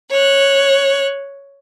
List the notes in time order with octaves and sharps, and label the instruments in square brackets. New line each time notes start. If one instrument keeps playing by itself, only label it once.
[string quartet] C#5 F#6